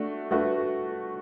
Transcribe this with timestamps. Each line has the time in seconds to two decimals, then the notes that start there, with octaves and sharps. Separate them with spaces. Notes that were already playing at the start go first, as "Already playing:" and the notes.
Already playing: A3 D4 F#4
0.31 A3 D4 F#4 B4